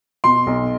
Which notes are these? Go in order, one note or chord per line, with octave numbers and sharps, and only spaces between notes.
B2 C6
B1